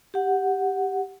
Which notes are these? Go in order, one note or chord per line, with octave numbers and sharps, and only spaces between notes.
G4 F#5